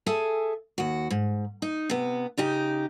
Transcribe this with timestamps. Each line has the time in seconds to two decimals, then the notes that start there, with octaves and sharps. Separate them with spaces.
0.06 G#4 A4 E5 G#5
0.78 D#2 F#4
1.10 G#2
1.62 D#4
1.90 C3 B3
2.38 C#3 D#4 G4